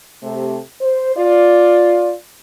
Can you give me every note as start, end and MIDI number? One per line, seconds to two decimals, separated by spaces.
0.23 0.58 48
0.23 0.58 57
0.81 1.14 72
1.16 2.12 65
1.16 2.12 74